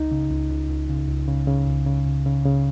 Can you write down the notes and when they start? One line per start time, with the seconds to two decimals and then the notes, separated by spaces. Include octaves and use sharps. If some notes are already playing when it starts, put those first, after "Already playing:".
Already playing: C#2 D#4
0.12 C#3
0.31 C#2
0.50 C#2
0.69 C#2
0.89 C#3
1.09 C#2
1.28 C#3
1.48 C#3
1.67 C#2
1.86 C#3
2.06 C#2
2.26 C#3
2.46 C#3